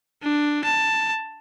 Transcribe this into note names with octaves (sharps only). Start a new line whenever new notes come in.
D4
A5